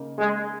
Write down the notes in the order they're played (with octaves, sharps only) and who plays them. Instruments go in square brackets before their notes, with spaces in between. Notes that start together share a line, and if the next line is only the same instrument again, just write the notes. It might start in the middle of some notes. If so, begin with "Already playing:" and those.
Already playing: [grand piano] C#3 A#3 D#4
[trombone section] G#3